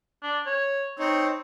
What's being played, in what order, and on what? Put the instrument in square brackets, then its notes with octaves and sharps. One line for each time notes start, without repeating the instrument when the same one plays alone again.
[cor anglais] D4
C#5
[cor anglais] C4 [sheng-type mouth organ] D#4 C#5